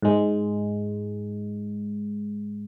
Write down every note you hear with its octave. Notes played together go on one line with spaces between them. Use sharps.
G#2 G#3